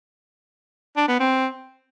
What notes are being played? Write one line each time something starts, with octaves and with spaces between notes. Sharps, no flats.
D4
B3
C4